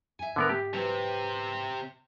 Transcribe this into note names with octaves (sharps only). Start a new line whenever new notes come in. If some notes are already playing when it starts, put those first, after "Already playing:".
F2 E5 G#5
G#2 D3 B3 A#4
G4
C3 E3 F#3 C4